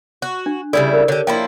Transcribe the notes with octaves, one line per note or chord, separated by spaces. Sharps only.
F#4
D4
C#3 G3 E4 A4 D5
A#4
D3 G4 C#5
F3 A#3 E4 G5